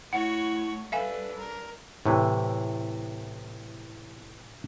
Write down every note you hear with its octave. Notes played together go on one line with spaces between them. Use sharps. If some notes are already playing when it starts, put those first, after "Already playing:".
A3 E4 F#4 C#5 F#5
G3 D4 A4 B4 E5 F5 G#5
A#4
A2 C3 E3